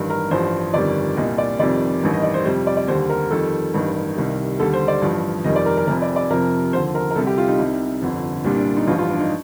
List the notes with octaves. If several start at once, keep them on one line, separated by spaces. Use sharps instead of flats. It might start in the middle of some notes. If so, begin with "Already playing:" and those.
Already playing: A1 G2 D#3
A#4
A1 G2 F3 C5
G1 F2 D#3 G3 D5
C2 A#2 G3 D#5
D5
F1 F2 C3 D#3 G3 D5
A1 G2 D#3 G3
D#5
D5
C5
F2 C3 G3 C5
D5
D5
D#2 D3 G3 C5
A#4
F2 D#3 G3 A4
A1 G2 D#3
C2 C3 D#3 G3
D#2 D3 G3 A4
C5
D5
A1 G2 F3
F1 F2 D#3 G3 D#5
D5
A#4
A#4
F1 F2 C3 A#4
D5
D5
F2 C3 F3 A#4
D#2 D3 F3 C5
A#4
A#4
C2 C3 G3 A4
G4
F4
D#4
C2 C3 G3
G1 F2 D3
C2 A#2 G3 D4
D4
D#4
A1 G2 F3 F4
F4
D4
D#4